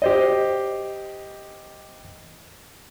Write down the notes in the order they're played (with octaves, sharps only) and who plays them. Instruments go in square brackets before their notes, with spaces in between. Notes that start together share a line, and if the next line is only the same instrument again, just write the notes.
[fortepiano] G4 C5 D#5